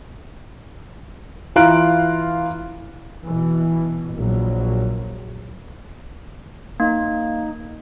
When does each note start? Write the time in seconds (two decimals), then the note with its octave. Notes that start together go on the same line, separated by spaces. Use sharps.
1.56 E3 F4 F5 A#5 F#6 D7
3.25 B2 E3
4.12 A#1 F#3
6.80 A#3 D#4